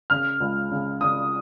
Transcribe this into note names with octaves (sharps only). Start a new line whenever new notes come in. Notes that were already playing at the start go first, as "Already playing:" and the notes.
C#3 F6
C#2
C#3
C#3 D#6